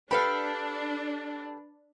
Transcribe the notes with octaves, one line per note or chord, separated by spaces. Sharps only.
D4 G4 A4 B4 F5 B5